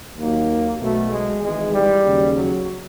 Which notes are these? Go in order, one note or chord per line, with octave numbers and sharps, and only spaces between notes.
D#2 D#3 F#3 A#3
B1 B2 F#3 A3
G#3
G#1 G#2 E3 G#3
G3
D#2 C#3 F#3
F#3